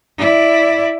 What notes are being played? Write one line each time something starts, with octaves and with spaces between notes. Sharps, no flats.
E4 D5